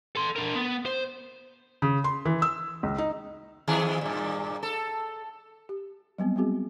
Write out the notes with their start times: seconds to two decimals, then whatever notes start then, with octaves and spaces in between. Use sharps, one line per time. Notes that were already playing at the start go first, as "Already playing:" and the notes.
0.16 A4 C6
0.36 D4 A#4
0.55 B3
0.86 C5
1.82 C#3
2.04 C6
2.25 E3
2.42 E6
2.83 C#2
2.98 D#4
3.67 F2 D#3 G#4
4.01 G2 A#2
4.63 A4
5.69 G4
6.18 F#3 G3 B3 C4
6.36 G3 G#3 B3 C4 F#4 G#4